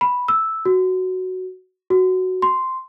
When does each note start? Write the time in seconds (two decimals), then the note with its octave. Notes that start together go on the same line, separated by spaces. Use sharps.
0.01 B5
0.28 E6
0.65 F#4
1.90 F#4
2.42 C6